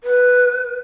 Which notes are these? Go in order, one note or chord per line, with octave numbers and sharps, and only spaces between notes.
B4